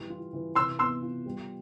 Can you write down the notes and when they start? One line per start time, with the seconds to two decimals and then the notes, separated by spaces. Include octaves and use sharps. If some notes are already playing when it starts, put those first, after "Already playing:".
Already playing: E3 G3
0.10 F4
0.33 E3
0.55 C3 C6 E6
0.79 B3 C6 E6
1.02 F4
1.26 G3